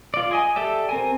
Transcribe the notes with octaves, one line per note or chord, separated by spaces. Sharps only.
F4 D5
G#4 D#5 G#5
G4 A4 D5 E5
C4 A#4 G#5